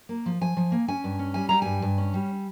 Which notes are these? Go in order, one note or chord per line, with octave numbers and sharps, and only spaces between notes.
A#3
F3
F3 G#5
F3
A#3
C#4 G#5
G2
C#4
G3 G#5
G3 A#5
G2 G#5
G2
C#4
G3